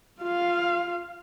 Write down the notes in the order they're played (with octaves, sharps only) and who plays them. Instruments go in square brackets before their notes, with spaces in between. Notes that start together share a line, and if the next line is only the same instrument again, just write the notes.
[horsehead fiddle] F4 F5